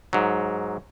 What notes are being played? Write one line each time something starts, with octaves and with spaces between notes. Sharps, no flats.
G#2 F#3